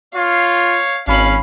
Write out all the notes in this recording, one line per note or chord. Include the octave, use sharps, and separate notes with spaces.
F4 C#5 F5
G#1 C#4 F5 B5